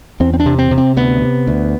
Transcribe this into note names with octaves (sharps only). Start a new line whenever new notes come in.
E2 C4
C4
D4
C3
C4
C3
C4
D2 B3
C3
D2